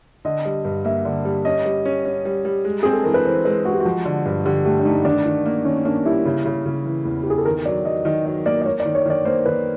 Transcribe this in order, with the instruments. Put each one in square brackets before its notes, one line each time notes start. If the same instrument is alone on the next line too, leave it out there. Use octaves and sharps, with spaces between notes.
[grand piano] D3 [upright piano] D#5
[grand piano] G3
G2
[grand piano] A#3 [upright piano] E5
[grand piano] D3
G3
[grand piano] C#4 [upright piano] D#5
[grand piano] G3
C#4
C#4
G3
G3
G#3
[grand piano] C4 [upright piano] G#4
[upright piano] A4
[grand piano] E3 [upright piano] A#4
[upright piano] B4
[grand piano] E3 [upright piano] C5
[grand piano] G#3 [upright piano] B4
[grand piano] G#3 [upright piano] F#4
[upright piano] G4
F#4
[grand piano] F3
D3
G2
[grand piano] D3 [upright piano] G4
[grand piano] A3 [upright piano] G4
[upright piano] D4
[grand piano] A3 [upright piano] D#4
[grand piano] D#3 [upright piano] D4
[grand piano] D#3
A#3
[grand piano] D#3 [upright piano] C#4
[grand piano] A#3 [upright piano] D4
[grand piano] G3 [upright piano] E4
[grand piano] C#3
C#3
C#3
E3
E2
[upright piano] G4
[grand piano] E2 [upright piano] G#4
[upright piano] A4
[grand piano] D#3 [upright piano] A#4
[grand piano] F#3 [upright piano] D5
[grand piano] F#3 [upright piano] D#5
[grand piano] D#3 [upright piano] D#5
[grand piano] F#3 [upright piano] D#5
[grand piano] A#3 [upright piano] D5
[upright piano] D5
[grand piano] A#3 [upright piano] C#5
[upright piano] D5
[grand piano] D#3
[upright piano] C#5
[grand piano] D#3 [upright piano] D5
[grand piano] A#3 [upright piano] C5
[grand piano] D#3 [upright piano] B4